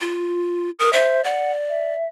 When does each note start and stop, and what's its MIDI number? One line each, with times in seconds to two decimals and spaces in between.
0.01 0.70 65
0.79 0.92 70
0.79 0.93 87
0.93 1.21 72
0.93 1.22 76
1.24 1.94 74
1.24 1.52 78
1.69 2.08 76